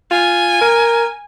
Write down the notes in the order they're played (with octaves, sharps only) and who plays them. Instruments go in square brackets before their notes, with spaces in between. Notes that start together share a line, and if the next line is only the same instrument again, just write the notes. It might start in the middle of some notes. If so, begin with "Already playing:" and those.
[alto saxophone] F4 [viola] G#5
[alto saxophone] A#4